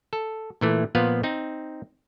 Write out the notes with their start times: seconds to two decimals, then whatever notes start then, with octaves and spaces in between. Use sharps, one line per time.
0.13 A4
0.61 A#2 E3 A3
0.95 A#2 F3 B3 B4 F5
1.23 C4 D#4